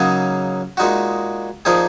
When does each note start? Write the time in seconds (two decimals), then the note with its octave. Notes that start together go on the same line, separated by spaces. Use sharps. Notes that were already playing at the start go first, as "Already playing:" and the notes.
Already playing: C#3 F#3 A#3 D#4 G#4
0.77 A#2 G#3 D#4 F#4
1.65 A#2 F3 A#3 D#4 G#4